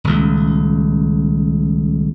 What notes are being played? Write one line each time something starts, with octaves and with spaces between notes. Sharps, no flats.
D#1 C#2